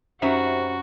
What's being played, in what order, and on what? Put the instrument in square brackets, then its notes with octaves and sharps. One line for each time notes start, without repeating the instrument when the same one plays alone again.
[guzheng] F#2 B4 F#5 [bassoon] C3 [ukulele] C#4 D#4 E5 [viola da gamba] F#4